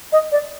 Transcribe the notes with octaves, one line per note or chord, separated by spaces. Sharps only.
D#5
D5